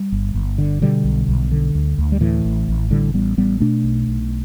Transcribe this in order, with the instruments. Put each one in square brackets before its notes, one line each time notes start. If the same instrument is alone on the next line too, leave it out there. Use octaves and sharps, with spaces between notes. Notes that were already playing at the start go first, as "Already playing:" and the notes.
Already playing: [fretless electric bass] G3
G1
G1
D3
B2 D3 G3
B1
B1
D3
D2
D2
G3
A2 E3
A1
A1
A2 D3 G3
A1 G3 B3
A1 G3 B3
B2 A3 D4
B1
B1